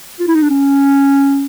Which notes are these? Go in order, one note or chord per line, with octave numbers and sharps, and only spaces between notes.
F4
E4
D#4
D4
C#4